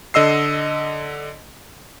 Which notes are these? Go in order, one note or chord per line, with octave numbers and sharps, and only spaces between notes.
D3 D#5 E6 C7